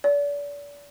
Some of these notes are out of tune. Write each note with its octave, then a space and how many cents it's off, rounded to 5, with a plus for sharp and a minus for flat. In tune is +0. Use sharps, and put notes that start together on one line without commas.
D5 -35